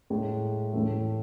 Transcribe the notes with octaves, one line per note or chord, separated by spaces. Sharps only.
A2 G#3
A2 E3 A3